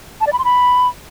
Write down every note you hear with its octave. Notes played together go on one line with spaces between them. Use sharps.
A5
D5
B5
C6
B5